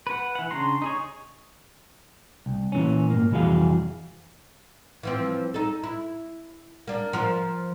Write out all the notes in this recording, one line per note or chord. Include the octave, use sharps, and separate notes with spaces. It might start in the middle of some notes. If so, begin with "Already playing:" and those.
B4 F#5
E3 F#5
C#3 D4 A#5 C6
D#4 G#4 C#5
C2
A#2 E3 C#4
G#2 A#3
C2 F2 E3 F#4 G#4 F5
E3 F3 C4
D#4 A4
E4
A#3 D4
F3 A#4